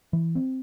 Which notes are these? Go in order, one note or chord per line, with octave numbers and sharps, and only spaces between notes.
E3
C4